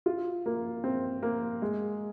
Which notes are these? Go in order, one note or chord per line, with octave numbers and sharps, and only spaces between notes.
F4
A#3
C4
A#3
G#3